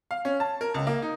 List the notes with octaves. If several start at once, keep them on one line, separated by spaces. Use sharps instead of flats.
F5
C#4
A5
A#4
C#2
A#3
D#4